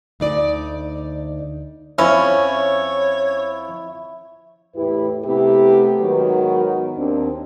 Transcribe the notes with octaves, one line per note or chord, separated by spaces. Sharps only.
D2 D#4 D5
F2 C#4 E4 C#5
E2 A2 E4 G4 B4
C3 A3 B3 E4 G4
G#2 D#3 F#3 B3
D#2 C4 D4